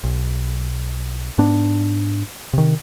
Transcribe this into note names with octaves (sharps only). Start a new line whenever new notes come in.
B1
G#2 B3 D4
C3 D#3